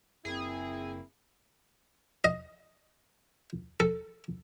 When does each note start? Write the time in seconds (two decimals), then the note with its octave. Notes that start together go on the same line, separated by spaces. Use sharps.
0.25 F#1 A#3 C4 E4 G#4
2.24 D#5
3.80 A4